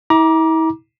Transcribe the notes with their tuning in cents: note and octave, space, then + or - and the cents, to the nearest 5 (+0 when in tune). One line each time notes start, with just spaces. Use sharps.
E4 -40 A#5 +30 D6 +0